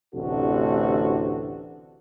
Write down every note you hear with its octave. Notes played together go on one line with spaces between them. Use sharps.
A1 D2 C3 D4 F#4 A4